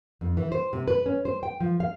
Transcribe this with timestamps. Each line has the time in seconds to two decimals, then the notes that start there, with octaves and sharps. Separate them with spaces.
0.21 F2
0.37 E3
0.52 C5
0.73 C3
0.88 B4
1.06 C#4
1.25 C5
1.43 G5
1.60 F3
1.80 F5